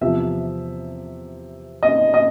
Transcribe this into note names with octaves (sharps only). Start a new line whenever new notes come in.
E2 C3 F3 E5
D#5
D#5